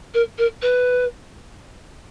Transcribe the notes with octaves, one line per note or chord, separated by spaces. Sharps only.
A#4
A#4
B4